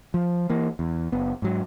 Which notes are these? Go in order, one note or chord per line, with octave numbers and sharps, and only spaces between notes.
F3
E3 A#3
E2
F#1 B3
G#2 F#3